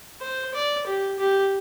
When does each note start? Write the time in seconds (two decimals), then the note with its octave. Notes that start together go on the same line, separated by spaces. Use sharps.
0.21 C5
0.54 D5
0.87 G4
1.19 G4